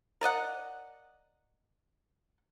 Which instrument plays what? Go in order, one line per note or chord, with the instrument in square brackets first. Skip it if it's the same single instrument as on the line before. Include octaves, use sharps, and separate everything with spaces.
[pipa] A#4 D5 D#5 F#5